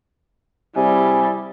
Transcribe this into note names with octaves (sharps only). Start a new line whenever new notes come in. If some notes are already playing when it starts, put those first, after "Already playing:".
C3 G3 E4 G#4